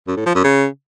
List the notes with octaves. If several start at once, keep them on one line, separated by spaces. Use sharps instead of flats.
F#2
A2
F3
F#2
C#3